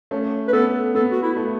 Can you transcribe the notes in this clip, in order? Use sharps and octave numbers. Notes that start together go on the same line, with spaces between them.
A3 C#4
B4
B3 A4
B3 A4
F#4
E4
A3